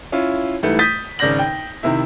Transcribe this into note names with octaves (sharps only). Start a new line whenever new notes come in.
C#4 E4 F4
G#2 E3 G3 A3
D#6 G6 A6 B6 D#7
G#1 C#3 D5 G6 A#6 F#7
G5
C3 D#3 E4